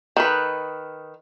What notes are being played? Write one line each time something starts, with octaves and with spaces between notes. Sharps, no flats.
D#3 A4 B4